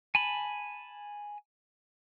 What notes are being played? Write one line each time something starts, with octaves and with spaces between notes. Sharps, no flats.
G#5 A5 B5